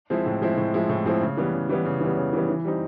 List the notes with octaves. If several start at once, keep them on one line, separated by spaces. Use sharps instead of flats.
F3 G#3 C4 E4
A2
F3 G#3 C4 E4
A2
F3 G#3 C4 E4
A2
F3 G#3 C4 E4
C#3
E3 G3 B3
C#3
E3 G3 B3
C#3
E3 G3 B3
C#3
E3 G3 B3
E3
G3 C4 D#4